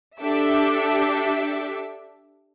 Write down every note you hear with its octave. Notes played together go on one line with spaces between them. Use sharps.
D4 G4 A4 E5 D6